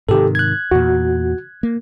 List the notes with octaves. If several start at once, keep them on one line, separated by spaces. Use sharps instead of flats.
G#2 C3 D#3 G4 A4
F#6 G#6
E2 A#2 F#4
A#3